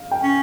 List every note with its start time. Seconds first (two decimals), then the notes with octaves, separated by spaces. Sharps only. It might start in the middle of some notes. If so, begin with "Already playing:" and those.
Already playing: F5
0.11 G5
0.23 C#4